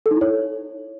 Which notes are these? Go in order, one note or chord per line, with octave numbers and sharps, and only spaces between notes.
A4
D#4
E4
C#5